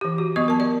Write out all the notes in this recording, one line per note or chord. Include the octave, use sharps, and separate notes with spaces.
E3 G4
F#4
F#3 B3 D#5 C#6
A#4 A5
D5